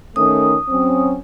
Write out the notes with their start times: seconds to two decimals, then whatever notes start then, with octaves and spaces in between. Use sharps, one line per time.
0.16 D#3 A3 C#4 D#6
0.69 F#3 C4 C#4